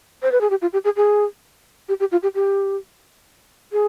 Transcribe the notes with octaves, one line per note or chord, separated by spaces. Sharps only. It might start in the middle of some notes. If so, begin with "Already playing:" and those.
C5
B4
G#4
G4
F4
G4
G#4
G#4
G4
G4
F4
G4
G4
G#4